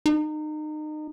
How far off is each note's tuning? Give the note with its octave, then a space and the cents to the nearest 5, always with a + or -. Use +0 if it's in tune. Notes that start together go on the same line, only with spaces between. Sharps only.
D#4 -30